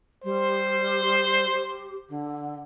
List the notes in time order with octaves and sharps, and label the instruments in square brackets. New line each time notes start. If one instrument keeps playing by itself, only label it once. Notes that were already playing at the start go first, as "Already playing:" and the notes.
[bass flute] G3 [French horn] C5
[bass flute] G4
D3